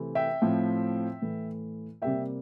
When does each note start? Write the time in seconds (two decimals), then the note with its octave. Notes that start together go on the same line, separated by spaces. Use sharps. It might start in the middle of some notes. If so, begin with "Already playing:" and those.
Already playing: C3 E3 A3 C4
0.15 E5 G5
0.42 A2 F3 C4
1.22 A2 E3 A3
2.02 C3 G3 A#3 E5 G5